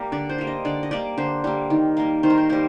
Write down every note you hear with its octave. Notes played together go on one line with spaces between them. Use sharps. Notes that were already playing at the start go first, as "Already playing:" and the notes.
Already playing: G3 A#3 A#4
D3 D5
C5
G3 A#3
D#5
D3 D5
D#5
G3 A#3 D5
D3 C5
G3 A#3
D#3
G3 A#3
D#3 C5
A#4
C5
G3 A#3 C5